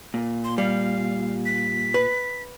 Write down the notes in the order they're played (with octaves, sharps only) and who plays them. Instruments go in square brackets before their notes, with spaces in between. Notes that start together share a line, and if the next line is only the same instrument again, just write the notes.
[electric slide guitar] A#2
[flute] C6
[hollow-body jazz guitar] G3 [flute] F5
[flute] B6
[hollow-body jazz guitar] B4